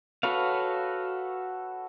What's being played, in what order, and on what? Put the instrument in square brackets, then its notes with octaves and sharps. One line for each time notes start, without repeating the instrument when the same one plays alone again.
[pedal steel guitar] F#4 A4 B4 C#5 F5